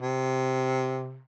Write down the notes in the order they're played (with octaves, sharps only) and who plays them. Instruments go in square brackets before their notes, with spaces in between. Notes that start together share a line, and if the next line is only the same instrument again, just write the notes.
[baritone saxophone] C3